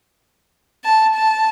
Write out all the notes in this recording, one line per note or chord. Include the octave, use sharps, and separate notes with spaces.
A5
A5